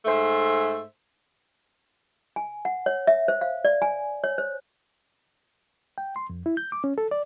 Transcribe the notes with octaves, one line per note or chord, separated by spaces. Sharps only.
G#2 A3 C5 E5
G#5
F#5
C#5
E5
C5
F5
D5
G#5
C#5
C5
G5
C6
F2
E4
G6
D6
C#4
A4
D5